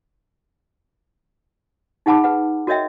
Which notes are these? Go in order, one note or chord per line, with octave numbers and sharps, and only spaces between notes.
D#4 G#4 F#5 A5 B5 D6
G#4 B4 F#5
F#4 A#4 C#5 D#5 E5 G5